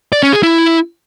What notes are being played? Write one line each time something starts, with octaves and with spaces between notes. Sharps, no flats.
D5
C#4
G#4
E4